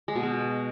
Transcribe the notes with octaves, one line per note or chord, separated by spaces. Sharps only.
G#3
B2
G#3